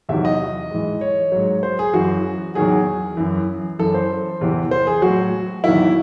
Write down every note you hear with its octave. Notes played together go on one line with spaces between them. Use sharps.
E2 C3 D#3 F#3 E5
D#5
G#2 E3
C#5
G#2 F#3
C5
G#4
F#2 E3 F#4
E2 D#3 F#3 G#4
F#2 E3
F#2 E3 A4
C5
E2 C3 E3
C5
G#4
A2 F#3 F#4
E2 D#3 F#3 E4